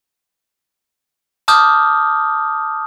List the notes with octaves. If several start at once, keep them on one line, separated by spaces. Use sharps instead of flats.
A5 D6 D#6 F6 G6